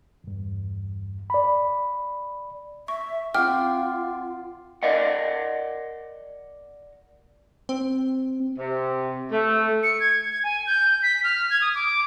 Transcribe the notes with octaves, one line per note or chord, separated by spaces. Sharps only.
E2 G2
D5 B5
E5 C#6
C4 F4 F#5 G5 D6 F6
A#4 D5 D#5 F#5
C4
C3
A3
C#7
G#6
G#6
G#5
G6
B6
F6
G#6
D#6
D6